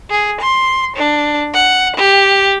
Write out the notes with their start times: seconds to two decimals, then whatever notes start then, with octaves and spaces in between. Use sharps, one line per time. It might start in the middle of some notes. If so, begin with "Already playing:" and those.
0.11 G#4
0.41 C6
0.97 D4
1.55 F#5
1.97 G4